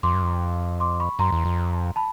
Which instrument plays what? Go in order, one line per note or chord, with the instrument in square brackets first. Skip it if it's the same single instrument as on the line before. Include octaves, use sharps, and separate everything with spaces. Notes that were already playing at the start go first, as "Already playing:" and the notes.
[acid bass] F2 [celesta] C6 D6
[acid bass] F#2
F2
[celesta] C6 D6
B5 C#6
[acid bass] F#2 [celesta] A#5 C6
[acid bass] E2
F2
[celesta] A5 B5